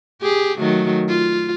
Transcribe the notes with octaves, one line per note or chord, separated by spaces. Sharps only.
G4 G#4
D#3 F#3 A3
F4